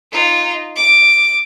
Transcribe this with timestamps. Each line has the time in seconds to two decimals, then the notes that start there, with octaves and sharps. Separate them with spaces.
0.12 D#4 F4
0.76 D6